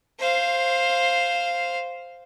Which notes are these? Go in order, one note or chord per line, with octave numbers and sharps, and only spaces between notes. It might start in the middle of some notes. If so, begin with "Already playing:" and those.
C5 F5